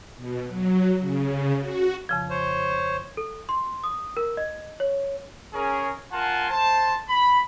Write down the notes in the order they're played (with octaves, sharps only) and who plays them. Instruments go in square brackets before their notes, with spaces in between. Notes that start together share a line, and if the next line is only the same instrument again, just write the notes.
[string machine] B2
F#3
C#3
F#4
[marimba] F2 C#3 F3
[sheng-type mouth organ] C5 C#5
[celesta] A4
C6
D#6
A#4
D#5
C#5
[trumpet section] C#4 G#4 A#4
F4 A#4 F#5 G#5 A5 C6
C5 A5
B5